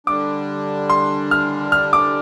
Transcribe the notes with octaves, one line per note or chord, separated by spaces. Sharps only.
D3 G3 D4 D6
C6
F6
F6
D6